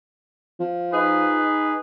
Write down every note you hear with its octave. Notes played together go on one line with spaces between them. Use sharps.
F3
D#4 G#4 B4